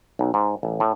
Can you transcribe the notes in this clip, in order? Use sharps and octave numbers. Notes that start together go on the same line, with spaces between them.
B1
G#2
A1
A2